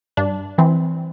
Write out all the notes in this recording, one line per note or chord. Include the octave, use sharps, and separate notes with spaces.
G2 D4
E3 C4